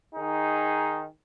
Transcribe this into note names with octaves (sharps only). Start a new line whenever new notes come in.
D#3 D#4 G#4